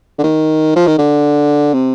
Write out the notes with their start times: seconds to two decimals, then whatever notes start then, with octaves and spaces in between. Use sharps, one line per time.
0.18 D3
0.23 D#3
0.76 F3
0.87 D#3
0.98 D3
1.74 C3